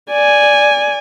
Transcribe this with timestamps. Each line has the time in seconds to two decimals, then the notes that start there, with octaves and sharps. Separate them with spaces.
0.10 D5 G#5